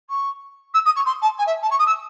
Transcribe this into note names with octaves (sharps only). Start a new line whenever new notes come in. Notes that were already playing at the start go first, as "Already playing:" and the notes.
C#6
E6
D#6
C#6
C6
A5
G#5
E5
A5
C#6
D#6
E6